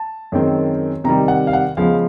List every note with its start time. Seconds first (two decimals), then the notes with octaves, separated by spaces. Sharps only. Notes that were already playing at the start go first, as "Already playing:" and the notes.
Already playing: A5
0.32 F#2 D#3 G#3 C4
1.04 C3 D#3 G3 A#5
1.28 F#5
1.47 F5
1.53 F#5
1.77 C#3 F3 G#3 B3 F5